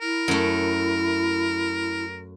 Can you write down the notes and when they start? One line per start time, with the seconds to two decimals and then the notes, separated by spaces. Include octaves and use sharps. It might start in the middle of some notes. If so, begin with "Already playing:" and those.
0.01 E4 A#4
0.28 F#2 A3